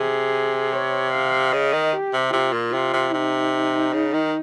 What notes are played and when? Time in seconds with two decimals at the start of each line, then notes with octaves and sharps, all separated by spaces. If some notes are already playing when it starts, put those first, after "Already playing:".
Already playing: C3 G#4
0.73 C#5
1.13 F5
1.53 C#3 D#5
1.73 D#3
1.93 G4
2.13 C3
2.33 C3 F4
2.53 A#2
2.73 C3 F4
2.93 C3
3.13 C3 D#4
3.93 C#3
4.13 D#3